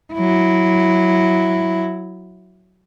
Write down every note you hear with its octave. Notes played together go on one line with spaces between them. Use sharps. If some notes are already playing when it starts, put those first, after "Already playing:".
F#3 E4